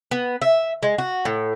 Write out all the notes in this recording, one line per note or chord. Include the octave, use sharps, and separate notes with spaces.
B3
E5
G#3
F#4
A2